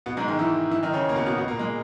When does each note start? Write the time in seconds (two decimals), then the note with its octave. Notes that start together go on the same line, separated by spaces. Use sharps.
0.06 B2 B3
0.17 G#2 G#3
0.28 D#3 D#4
0.39 E3 E4
0.71 E3 E4
0.83 D#3 D#4
0.94 C#3 C#4
1.09 A#3
1.16 B2 B3
1.26 B2 B3
1.38 B2 B3
1.48 A#2 A#3
1.59 G#3